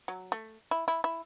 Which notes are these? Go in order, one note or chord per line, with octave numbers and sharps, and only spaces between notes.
F#3
A3
E4
E4
E4